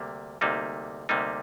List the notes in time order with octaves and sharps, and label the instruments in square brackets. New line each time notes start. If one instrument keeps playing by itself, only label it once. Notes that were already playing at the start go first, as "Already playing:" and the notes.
Already playing: [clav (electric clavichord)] D2 C3 G3 A#3
D2 C3 G3 A#3 D#4
D2 C3 G3 A#3 D#4